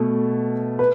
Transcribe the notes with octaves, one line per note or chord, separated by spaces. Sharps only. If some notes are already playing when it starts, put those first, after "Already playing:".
Already playing: B2 A3
B4